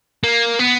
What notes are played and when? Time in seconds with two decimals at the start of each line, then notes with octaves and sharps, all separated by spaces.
0.23 A#3
0.59 B3